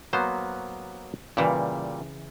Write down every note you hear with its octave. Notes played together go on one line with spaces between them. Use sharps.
F#3 A#3 B3 C5
A#2 C#3 E3 G3